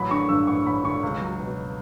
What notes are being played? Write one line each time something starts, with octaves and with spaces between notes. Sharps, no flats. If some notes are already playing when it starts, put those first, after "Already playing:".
Already playing: A1 F#3 B5
D3 C#6
G2 E6
A1 C#6
A1 B5
D3 C#6
C#2
F#3
B2